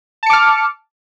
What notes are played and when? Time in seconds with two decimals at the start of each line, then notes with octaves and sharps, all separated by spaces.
0.23 A5
0.26 C#7
0.30 D6
0.33 F6